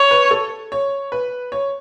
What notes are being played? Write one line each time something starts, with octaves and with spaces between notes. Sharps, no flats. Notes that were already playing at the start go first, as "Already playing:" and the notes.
Already playing: C#5
B4
A4
C#5
B4
C#5